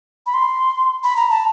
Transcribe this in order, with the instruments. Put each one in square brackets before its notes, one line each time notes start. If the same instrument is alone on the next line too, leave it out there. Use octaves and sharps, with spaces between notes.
[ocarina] B5
C6
B5
A#5
A5